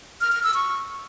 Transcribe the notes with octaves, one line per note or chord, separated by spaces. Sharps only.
F6
F6
E6
C#6